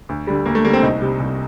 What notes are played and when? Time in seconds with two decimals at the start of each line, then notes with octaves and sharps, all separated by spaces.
0.09 D2
0.27 D3 G3
0.46 D2 A#3
0.55 A3
0.65 D3 G3 A#3
0.73 C4
0.83 C2 D#4
1.02 C3 G3
1.19 C2